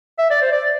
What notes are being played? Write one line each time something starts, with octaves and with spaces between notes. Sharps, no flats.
E5
D5
C5
D5